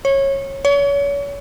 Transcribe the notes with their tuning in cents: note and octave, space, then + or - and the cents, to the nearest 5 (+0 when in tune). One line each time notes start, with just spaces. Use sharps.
C#5 -20
C#5 +35